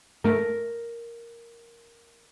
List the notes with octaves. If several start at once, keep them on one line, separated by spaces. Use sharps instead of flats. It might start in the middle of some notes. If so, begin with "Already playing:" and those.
G#2 A3 A#4